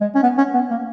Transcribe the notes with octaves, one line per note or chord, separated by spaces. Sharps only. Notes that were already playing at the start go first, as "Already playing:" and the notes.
G#3
C#4
B3
C#4
B3
A#3